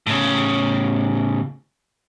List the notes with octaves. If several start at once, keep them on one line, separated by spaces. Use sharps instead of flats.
A2 C#3